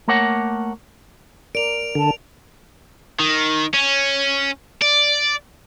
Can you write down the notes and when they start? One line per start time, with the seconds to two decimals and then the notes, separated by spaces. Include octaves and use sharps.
0.08 A3 A#3 A#4 C#5 F#5
1.55 A#4 D5 D7 F7
1.95 D3 A5
3.20 D#3
3.74 C#4
4.82 D5